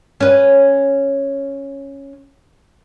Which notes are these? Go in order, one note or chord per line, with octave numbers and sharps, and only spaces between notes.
C#4 B4